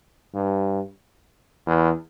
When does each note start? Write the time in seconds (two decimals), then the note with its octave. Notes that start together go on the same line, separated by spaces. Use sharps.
0.34 G2
1.67 E2